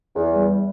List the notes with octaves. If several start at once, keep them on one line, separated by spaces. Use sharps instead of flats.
E2
G3